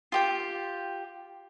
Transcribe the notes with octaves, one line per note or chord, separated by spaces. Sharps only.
F4 G4 G5